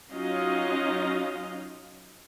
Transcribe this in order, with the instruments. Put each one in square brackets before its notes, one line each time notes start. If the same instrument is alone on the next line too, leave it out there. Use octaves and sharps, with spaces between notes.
[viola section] F#3 C#4 D#4 F4 D#5 F5